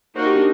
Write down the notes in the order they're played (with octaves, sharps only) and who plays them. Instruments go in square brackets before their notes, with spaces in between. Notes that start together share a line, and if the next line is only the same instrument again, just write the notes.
[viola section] A#3 D#4 F#4 A#4 [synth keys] C5
[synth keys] G4
D4